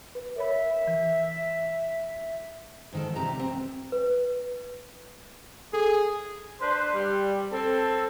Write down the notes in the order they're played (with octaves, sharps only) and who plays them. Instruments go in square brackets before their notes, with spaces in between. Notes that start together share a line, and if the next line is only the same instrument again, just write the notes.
[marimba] B4
[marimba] A#4 C#5 B5 [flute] E5
[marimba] E3
[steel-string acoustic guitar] G#2 D#3 A4
G2 C3 G4 A#5
C4
[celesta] B4
[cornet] G#4 [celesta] A4
[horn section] D4 B4 C5
G3
C4 A4